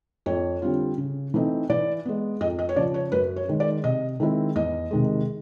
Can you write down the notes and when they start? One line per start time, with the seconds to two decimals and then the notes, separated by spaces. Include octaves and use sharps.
0.26 F2 C#5
0.62 D3 G3 C4 F4
0.98 C#3
1.34 E3 A3 C4 D#4
1.70 E3 D5
2.05 G#3 B3
2.41 F2 D#5
2.59 D#5
2.69 C#5
2.76 C#3 F3 D5
2.94 C#5
3.12 F#2 B4
3.36 C#5
3.48 D#3 G#3
3.60 D5
3.84 C3 D#5
4.20 D#3 G#3 C4 E4
4.56 E2 D#5
4.91 C3 D#3 G#3